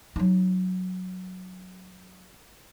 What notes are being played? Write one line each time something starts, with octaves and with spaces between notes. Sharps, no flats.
F#3 D#4